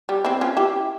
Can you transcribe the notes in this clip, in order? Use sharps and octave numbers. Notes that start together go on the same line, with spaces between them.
G3
C4 E4
C#4 F4
E4 G4